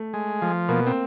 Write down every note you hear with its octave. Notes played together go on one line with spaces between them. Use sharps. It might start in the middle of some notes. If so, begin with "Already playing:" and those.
Already playing: A3
G#3
F3
B2 A#3
C4